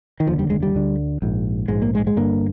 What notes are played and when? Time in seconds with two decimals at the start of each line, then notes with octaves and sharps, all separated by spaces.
0.20 D#3
0.26 F1 D#2 D3 F3
0.39 G3
0.50 G#3
0.63 G3
0.74 D2 D3
1.22 A#1 G#2
1.68 A#1 G#2 G#3
1.82 A#3
1.95 G#3
2.07 G#3
2.16 G1 G2 D3 A#3